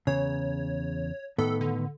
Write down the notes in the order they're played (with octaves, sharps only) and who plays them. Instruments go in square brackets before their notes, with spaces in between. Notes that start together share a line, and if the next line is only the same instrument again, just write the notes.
[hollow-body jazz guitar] E2 C#3 [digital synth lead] C#5
[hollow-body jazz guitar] A2 D#3 B3 [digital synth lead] A4
[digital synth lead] D3